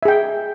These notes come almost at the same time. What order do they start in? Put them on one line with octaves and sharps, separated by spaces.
E5 G#4 G5